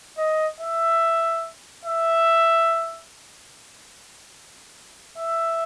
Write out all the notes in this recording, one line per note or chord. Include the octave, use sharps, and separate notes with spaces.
D#5
E5
E5
E5